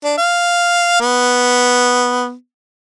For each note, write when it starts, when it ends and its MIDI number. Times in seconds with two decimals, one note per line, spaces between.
0.04 0.14 62
0.18 0.97 77
1.01 2.33 59